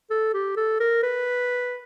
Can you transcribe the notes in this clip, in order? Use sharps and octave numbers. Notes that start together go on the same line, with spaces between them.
A4
G4
A4
A#4
B4